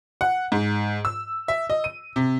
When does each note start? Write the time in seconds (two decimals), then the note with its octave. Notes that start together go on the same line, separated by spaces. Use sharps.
0.21 F#5
0.52 G#2
1.05 E6
1.48 E5
1.70 D#5
1.84 D#7
2.16 C3